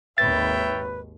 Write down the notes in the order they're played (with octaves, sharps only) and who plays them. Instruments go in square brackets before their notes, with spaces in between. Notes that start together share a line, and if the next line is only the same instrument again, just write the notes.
[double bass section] G#1 D#2 [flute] B4 [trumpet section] C#5 E5 G5 [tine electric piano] A6